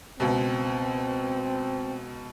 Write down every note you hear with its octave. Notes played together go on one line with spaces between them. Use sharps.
C#2 B2 C4